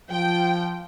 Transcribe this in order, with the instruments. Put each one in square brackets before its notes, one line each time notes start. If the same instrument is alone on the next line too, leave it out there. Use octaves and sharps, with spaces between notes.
[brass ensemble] F3 [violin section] G5